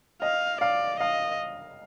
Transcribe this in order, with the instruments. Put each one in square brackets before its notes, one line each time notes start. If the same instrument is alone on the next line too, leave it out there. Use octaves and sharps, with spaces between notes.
[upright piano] D#5 [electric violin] F5
[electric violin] D5 [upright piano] F5
[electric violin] D#5 [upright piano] F5